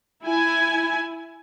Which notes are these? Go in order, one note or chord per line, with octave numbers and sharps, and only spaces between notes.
E4 G#5